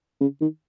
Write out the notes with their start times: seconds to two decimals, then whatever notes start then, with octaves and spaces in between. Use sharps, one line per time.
0.21 C#3
0.41 D#3